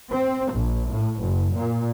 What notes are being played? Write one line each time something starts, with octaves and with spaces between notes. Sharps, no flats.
C4
A#1
A2
F#1
A#2